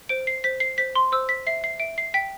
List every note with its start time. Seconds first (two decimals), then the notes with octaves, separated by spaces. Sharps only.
0.09 C5 D7
0.27 C7
0.44 C5 B6
0.60 C7
0.78 C5 B6
0.95 C6
1.12 C5 E6
1.29 B6
1.47 E5 C7
1.64 C7
1.80 E5 D7
1.98 C7
2.14 G5 B6